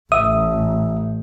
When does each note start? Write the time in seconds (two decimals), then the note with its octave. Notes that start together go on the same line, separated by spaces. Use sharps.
0.12 A1 E5 D#6